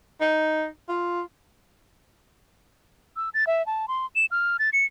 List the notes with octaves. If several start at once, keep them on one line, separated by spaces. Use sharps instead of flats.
D#4
F4
E6
A6
E5
A5
C6
E7
F6
A6
C#7